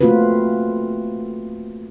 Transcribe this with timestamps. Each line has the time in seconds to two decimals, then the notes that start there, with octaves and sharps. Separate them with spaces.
0.01 A3 A#3 C4 F4 F#4 B4